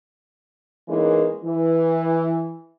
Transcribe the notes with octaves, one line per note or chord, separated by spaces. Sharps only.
E3 G#3 A#3 B3 C#4 D#4
E3